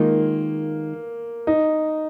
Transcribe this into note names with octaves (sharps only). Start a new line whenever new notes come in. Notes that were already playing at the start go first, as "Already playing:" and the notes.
Already playing: D#3 G#3 A#3 F4
D#4